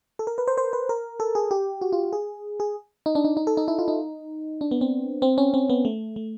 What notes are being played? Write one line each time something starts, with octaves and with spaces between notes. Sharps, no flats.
A4
A#4
B4
C5
C5
B4
A#4
A4
G#4
G4
F#4
F4
G#4
G#4
D#4
D4
D#4
D#4
A4
D#4
E4
F4
D#4
D4
B3
C4
C4
C#4
C4
B3
A3
A3